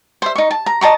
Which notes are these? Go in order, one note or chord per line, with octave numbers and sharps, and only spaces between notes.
C5 E5
D#4 C#6
A5
A#5
D#5 A5 A#5 C#6